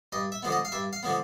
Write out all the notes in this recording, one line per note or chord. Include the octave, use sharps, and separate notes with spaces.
G2 D#5
E5
D3 F3 G#3 B3
D#5
F5
G2 E5
F5
D3 F3 G#3 B3